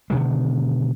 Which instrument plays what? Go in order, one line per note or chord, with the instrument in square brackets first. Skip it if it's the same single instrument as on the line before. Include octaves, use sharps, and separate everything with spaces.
[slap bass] B2 D3 D#3 G#3